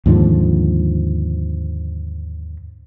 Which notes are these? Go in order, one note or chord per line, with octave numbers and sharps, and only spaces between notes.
D#2 G#2 D3 F3